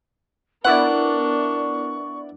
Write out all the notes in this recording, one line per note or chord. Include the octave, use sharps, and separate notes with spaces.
B3 D4 E4 A#4 D5 F#5 C#6